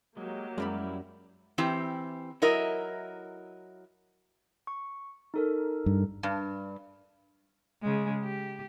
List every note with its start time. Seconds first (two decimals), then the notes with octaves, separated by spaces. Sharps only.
0.17 F#3 G#3 A#3 G4
0.58 F#2 G3 G#3 E4 D5 B5 F6
1.58 E3 C4 E4 G4
2.42 F#3 E4 A#4 D#5 E5
4.67 C#6
5.34 D#4 A4 A#4
5.86 G2
6.23 G2
7.82 C#3 G#3
8.24 G4